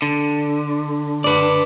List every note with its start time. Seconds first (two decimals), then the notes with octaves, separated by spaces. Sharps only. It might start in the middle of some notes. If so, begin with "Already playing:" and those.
0.02 D3
1.24 B4 D5